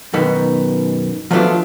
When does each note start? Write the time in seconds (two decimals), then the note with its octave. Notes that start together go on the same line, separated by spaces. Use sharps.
0.13 F#2 B2 D#3 B3
1.31 F3 F#3 A3 B3 D4 F4